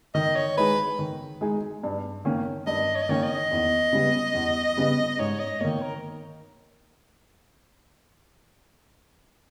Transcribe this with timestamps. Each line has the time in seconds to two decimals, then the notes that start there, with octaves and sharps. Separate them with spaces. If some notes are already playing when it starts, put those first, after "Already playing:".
0.14 D#3 D#5
0.35 C#5
0.57 G#3 D#4 G#4 B4
0.99 D#3
1.41 G#3 D#4 G#4
1.84 G2
2.25 D#3 A#3 C#4
2.67 G2 D#5
2.95 C#5
3.02 D#5
3.09 D#3 A#3 C#4 C#5
3.23 D#5
3.51 E2
3.93 C#3 G3 B3
4.35 E2
4.77 C#3 G3 B3
5.19 G#2 C#5
5.39 D#5
5.61 D#3 A#3 C#5
5.82 A#4